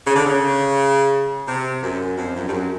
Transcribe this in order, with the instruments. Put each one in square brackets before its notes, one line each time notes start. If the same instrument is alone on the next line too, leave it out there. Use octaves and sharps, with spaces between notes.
[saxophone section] C#3
D3
C#3
C3
F#2
F2
F#2
G2
F#2